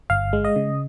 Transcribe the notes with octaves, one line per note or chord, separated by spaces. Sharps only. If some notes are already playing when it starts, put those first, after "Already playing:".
G1 F5
G#3
D#5
C#3